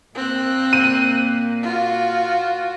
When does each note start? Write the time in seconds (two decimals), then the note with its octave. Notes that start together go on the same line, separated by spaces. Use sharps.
0.15 A#2 A#3 C4 F#6
0.73 D#7
1.63 F4 F#4